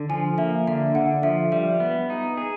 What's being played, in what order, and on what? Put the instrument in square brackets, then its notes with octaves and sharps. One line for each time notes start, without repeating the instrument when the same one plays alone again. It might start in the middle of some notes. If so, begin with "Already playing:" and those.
Already playing: [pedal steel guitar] D3
[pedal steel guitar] F3 [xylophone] G#5
[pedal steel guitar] A#3 [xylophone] E5
[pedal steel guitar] D3 [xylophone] E5
[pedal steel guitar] D3 [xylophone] F#5
[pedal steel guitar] F3 [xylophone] E5
[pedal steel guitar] G3 [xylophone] E5
[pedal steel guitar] B3
D#4
G#4